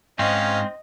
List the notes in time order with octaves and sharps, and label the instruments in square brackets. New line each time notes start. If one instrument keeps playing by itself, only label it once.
[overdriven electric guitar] G#2 [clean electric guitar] C4 [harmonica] C#4 F5 [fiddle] D#5